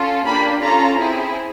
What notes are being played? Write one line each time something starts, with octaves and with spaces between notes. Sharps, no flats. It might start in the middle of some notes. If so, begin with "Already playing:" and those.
Already playing: C#4 F4 A4
A#3 D4 G4 B5
C#4 F4 A4 A#5
C4 E4 G#4